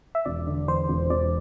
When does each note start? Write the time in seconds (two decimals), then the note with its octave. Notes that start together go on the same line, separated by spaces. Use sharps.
0.15 E5
0.25 E1 D5
0.47 D3
0.68 E2 C5
0.89 E1
1.10 E1 D5